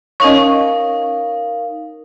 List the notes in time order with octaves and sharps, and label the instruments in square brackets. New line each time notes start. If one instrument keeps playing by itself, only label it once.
[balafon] C#4 C#6 [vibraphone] D#4 A#4 F5 [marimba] C#5 D#5